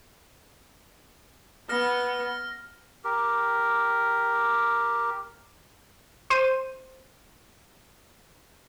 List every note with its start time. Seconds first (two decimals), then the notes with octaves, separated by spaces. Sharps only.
1.69 B3 F6 A#6
3.04 G4 A#4
6.30 C5 D#7